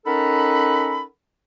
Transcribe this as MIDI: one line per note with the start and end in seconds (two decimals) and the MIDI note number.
0.06 1.02 61
0.06 1.02 63
0.06 1.02 69
0.06 1.02 70
0.06 1.02 78
0.06 1.02 83